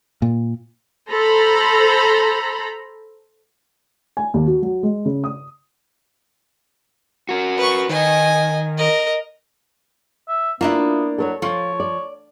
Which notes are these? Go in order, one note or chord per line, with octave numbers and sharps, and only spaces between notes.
A#2
A4 C5 A#5 B5
G#5
D#2
F#4
F#3
G#3
C#3
D#6
F#4 A#4
B4 C#6
D#3 D#5 G#5
A#4 D#5
E5
A#3 B3 D4 E4 F4
F#3 A4 A#4 C#5
F3 F4 C#5
D5